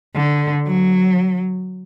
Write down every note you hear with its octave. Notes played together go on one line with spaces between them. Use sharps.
D3
F#3